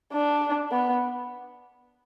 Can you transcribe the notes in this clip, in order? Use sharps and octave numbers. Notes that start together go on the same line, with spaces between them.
D4
B3